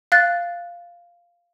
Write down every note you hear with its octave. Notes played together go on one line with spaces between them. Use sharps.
F5 F#6 A6